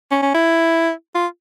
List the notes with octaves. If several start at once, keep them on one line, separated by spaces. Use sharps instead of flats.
C#4
C#4
E4
F4